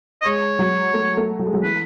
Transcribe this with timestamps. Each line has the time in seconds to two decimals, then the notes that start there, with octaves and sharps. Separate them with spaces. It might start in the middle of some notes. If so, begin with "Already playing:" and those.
0.21 D#5
0.25 G#3 C#5
0.59 F#3
0.94 A3
1.17 A3
1.39 F#3
1.47 G#3
1.53 F#3
1.62 E3 B4